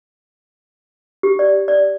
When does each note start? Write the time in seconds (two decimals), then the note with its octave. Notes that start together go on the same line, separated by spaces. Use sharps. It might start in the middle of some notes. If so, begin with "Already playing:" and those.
1.23 G4
1.39 D5
1.68 D5